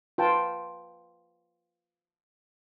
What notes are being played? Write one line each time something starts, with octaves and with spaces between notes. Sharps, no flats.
F4 B4 G5 A5